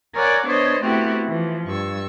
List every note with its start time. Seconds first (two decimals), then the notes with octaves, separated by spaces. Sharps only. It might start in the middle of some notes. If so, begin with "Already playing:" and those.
0.15 A#4 C#5 D5 F#5 G#5 D6
0.47 B3 D4 C5 C#5 D#5
0.83 A3 B3 C4 E4 F#4 G4
1.25 E3 F3
1.67 G2 C#6 E6